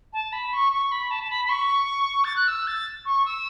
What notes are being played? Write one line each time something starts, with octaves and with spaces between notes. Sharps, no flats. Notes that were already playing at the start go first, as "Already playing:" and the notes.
A5
B5
C#6
C#6
B5
A5
A5
B5
B5
C#6
A6
F#6
E6
A6
C#6
E6